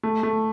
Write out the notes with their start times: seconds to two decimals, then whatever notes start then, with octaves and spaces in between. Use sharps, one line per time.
0.03 A3
0.23 A3